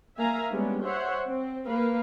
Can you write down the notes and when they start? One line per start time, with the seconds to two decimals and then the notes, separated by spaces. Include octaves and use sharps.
0.18 A#3 E5 F5 G#5 A#5
0.51 G3 G#3 B3 C#4 D4
0.83 C5 C#5 E5 F#5
1.26 C4
1.66 A#3 A#4 B4 F5